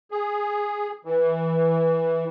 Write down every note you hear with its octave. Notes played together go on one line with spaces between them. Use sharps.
G#4
E3